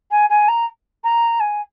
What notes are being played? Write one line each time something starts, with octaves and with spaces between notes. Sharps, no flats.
G#5
G#5
A#5
A#5
G#5